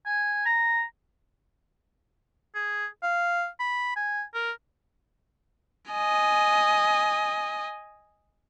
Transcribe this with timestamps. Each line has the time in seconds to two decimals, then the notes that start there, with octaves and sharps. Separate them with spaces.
0.06 G#5
0.46 A#5
2.55 G#4
3.03 F5
3.60 B5
3.96 G#5
4.34 A#4
5.92 D#5 G#5